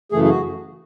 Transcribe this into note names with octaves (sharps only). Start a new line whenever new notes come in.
F#2 C#3 E3 A3 G#4
G#4
F#4